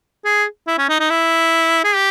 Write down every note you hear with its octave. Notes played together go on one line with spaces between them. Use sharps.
G#4
E4
C#4
D#4
D#4
E4
G#4
G4